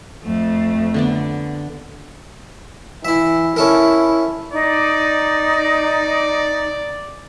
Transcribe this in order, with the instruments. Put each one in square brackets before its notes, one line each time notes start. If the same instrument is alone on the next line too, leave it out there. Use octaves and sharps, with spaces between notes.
[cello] F2 A3
[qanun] D3 B3 D5
[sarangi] E3 [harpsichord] E4 E5
[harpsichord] C#4 A4 A#4 [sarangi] E4
[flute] D#4 [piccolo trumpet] D5